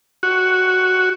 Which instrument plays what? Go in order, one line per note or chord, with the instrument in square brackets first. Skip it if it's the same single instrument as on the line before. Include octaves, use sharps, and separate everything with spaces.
[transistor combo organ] F#4